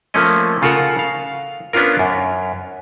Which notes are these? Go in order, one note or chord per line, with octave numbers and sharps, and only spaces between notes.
F3 A3 A#3 C#4 D#5
C#3 F4 A4 A#4 F#5
F5
B3 C#4 D4 F4 A#4
F#2